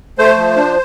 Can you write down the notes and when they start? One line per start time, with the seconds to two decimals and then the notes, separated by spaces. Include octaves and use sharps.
0.18 A3 C5
0.37 F3
0.56 D4